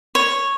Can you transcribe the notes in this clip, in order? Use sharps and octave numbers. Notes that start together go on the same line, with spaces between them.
C#5